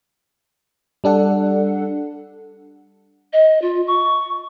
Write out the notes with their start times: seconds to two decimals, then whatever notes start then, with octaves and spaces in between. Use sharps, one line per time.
1.04 G3 D4 A4 F#5
3.33 D#5
3.62 F4
3.87 C#6